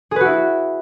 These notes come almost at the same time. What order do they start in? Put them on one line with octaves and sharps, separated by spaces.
G#4 B4 F#4 E4